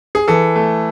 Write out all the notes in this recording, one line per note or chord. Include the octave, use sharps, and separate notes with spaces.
G#4
E3 A4
A3